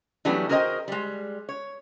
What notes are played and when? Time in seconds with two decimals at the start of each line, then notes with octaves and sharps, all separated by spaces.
0.25 E3 F#3 G3 A3 B3 D4
0.49 F#4 G#4 A#4 C5 D#5 G5
0.88 G3 G#3
1.49 C#5